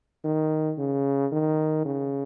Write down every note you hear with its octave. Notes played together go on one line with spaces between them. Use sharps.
D#3
C#3
D#3
C#3